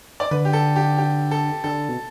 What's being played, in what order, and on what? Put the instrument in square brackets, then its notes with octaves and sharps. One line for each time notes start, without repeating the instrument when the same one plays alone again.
[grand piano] D5
[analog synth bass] D3 [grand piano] B4
[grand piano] G4
A4
G4
G4
A4
[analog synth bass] D3 [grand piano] A4
[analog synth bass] B2